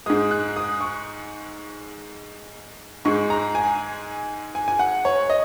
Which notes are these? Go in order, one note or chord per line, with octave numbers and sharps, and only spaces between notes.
G#2 G#3 D#6
F#6
D#6
C#6
G#2 G#3 C#6
A#5
G#5
G#5
G#5
F#5
C#5
D#5